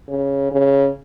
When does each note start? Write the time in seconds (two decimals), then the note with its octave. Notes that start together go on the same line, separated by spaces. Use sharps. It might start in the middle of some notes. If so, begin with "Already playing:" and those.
0.09 C#3
0.51 C#3